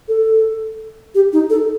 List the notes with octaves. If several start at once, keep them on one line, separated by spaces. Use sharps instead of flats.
A4
G4
D#4
A4